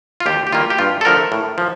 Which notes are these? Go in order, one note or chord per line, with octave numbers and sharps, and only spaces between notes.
F4
D#2 G4
G4
D#3 G3 A#3 F4
G4
G2 F4
A4
D3 F3 A3 A#4
A2
F3